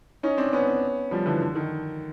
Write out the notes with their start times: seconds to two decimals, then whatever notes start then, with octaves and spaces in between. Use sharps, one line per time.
0.23 C#4 D#4
0.38 C4 D4
0.53 B3 C#4
1.11 F3 G3
1.26 D3 E3
1.41 D3
1.55 D#3